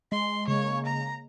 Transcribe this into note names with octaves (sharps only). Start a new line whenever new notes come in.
G#3 C6
C#3 G#3 A#3 C#5
A#5